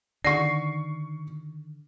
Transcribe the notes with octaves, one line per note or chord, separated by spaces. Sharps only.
D3 D#3 D5 F#5 C#6 C7